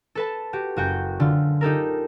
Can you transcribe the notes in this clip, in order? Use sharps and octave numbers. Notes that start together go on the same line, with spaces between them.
A4 B4 A5
F#4 G4
F#1 F#4 G5 G6
D3 F4
D#4 G4 A4 A#4